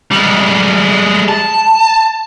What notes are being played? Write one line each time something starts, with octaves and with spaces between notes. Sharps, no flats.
G3 G#3
A5